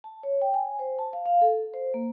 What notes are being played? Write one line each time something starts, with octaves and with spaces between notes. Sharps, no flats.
A5
C#5
G5
G#5
C5
A5
F5
F5
A4
C5
A#3